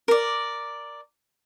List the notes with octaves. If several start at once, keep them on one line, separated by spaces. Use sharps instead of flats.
A#4 D5